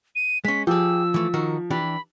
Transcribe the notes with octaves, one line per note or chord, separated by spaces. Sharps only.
D#7
G#3 C#4 B6
F3 G4 G#4 E6
E3 A3
D#3 F#4 A#4
E3 D4 G4 B5